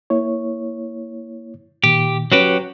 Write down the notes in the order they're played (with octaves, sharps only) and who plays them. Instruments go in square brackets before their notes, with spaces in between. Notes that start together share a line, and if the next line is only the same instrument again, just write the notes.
[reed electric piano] A#3 E4 C#5
[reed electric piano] A#2 D#3 [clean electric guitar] G4
[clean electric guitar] F#3 F#4 G4 [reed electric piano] C#4 B4 C#5